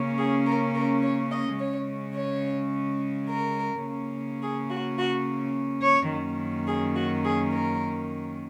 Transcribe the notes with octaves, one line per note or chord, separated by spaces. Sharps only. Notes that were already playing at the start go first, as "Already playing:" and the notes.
Already playing: C#3 A#3 C#4
G#4
A#4
A#4
C#5
D#5
C#3 G#3 C#4 C#5
C#5
A#4
C#3 A#3 C#4
G#4
F#4
F#4
C#5
F#2 D#3 A#3 C#4
G#4
F#4
G#4
A#4